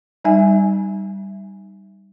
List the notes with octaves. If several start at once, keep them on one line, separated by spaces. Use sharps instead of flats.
G3 D#4 E5 G#5